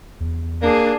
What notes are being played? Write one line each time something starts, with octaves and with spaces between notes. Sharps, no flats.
E2
A#3 D4 G#4